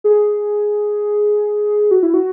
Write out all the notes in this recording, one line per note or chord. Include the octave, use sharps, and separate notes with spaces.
G#4
F#4
E4
F#4